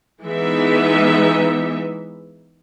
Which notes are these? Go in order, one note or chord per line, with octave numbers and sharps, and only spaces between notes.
E3 G#3 B3 D#4 E5